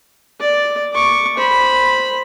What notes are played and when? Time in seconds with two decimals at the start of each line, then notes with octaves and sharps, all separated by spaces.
0.40 D5
0.93 C#6 D6
1.38 C5 B5